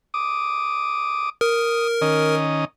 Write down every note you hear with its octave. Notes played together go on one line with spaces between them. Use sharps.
D6 D#6
A#4 D#6
D#3 C#4 D#5